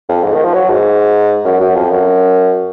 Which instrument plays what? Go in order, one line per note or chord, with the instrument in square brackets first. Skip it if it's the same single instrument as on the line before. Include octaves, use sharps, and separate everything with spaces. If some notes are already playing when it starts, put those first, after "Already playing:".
[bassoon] F2
G#2
D#3
F3
F#3
G#2
F#2
F#2
F2
F#2